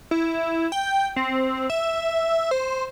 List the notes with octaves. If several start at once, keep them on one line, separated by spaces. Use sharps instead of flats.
E4
G5
C4
E5
C5